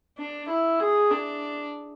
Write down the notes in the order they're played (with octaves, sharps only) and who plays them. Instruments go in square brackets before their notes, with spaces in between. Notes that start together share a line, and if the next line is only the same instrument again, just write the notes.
[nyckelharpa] D4
E4
G#4
D4